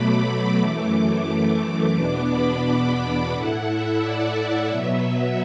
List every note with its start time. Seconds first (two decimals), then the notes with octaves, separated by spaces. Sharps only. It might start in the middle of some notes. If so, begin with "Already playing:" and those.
Already playing: B2 F#3 A3 B5 D6
0.59 F#2 E3 A3 D6
1.95 E2 B2 B3 D4 D6
2.30 B5
3.32 A2 A3 E4 F#5
3.66 E5
4.00 D5
4.68 B2 F#3 B3 E5